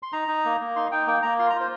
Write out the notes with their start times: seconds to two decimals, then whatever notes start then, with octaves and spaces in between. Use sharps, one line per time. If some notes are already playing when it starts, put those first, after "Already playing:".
0.03 C6
0.13 D#4 A#5
0.28 D#4
0.45 A#3
0.61 A#3
0.76 D#4 C6
0.92 D#4 G5
1.07 A#3 G5
1.23 A#3 A#5
1.39 F4 C6
1.50 A#5
1.55 F4 C5